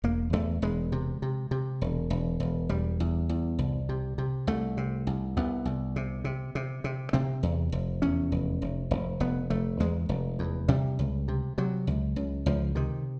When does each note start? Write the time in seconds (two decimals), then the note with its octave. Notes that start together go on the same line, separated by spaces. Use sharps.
0.04 E1 A#3
0.33 E2 A3
0.62 E1 G#3
0.92 C3
1.22 C3
1.51 C3
1.81 E1
2.10 E1
2.40 E1
2.69 E1 G3
3.00 E2
3.29 E2
3.59 C2
3.89 C3
4.18 C3
4.47 C2 A3
4.77 C3
5.07 C2
5.37 C2 B3
5.65 C2
5.96 C3
6.24 C3
6.55 C3
6.84 C3
7.13 C3 C4
7.43 E2
7.72 F1
8.02 E2 C#4
8.32 F1
8.62 F1
8.91 F1
9.20 F1 B3
9.50 F1 A3
9.80 E2 G#3
10.09 F1
10.39 E2
10.68 C3 G3
10.99 C#2
11.28 C3
11.58 C3 F#3
11.87 C#2
12.16 C#2
12.46 C#2 F3
12.75 C3 D#3